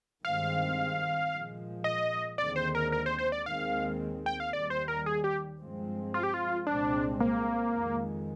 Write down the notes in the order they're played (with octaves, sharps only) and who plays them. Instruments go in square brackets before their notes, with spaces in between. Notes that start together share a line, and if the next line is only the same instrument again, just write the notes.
[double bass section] G2 D#3 G#3 C4 [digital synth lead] F5
[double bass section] A#2 F3 G#3
[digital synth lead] D#5
[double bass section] D#2 D3 G#3 C4 [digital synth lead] D5
[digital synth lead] C5
A#4
A#4
C5
C5
D5
[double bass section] D#2 D#3 G#3 C4 [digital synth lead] F5
[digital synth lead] G5
F5
[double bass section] D#2 D#3 G3 [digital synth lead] D5
[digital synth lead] C5
A#4
G#4
G4
[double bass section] G2 F3 G#3 C4
[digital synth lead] F4
G4
F4
[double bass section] C2 A#2 G#3 C4 [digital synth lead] D4
[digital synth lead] A#3
[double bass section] F2 D#3 G#3